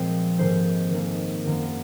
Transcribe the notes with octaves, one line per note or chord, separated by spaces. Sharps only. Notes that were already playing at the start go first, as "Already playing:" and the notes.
Already playing: A#2 F3 G#3 C4
G#2 D#3 A#3 C5
G#2 D#3 A#3
F#2 D#3 A#3